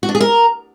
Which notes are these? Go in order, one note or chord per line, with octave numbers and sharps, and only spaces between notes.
F#4
D4
G#4
A#4